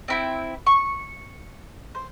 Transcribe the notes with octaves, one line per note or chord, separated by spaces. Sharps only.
C4 E4 G5
C#6
C5